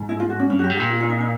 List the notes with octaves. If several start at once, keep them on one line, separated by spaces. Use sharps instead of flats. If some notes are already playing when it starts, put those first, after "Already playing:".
Already playing: G#2
E4
F4
F#4
C#4
G2 C#4
F#2 F#4 G4
G2
A#2 G4
F4
F4
D#4
D#4